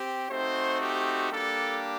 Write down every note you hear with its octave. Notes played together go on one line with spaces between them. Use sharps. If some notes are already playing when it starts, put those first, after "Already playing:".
Already playing: C4 G4
A3 C4 D#4 F#4 C5
G4
G3 A#3 D4 G4 A4